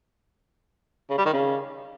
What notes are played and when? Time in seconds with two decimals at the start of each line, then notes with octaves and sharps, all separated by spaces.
1.10 C#3
1.18 G3
1.25 D#3
1.33 C#3